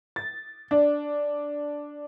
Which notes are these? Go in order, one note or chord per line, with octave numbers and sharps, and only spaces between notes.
A6
D4